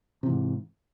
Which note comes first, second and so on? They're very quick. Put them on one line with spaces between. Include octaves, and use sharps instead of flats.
C3 E3 G#2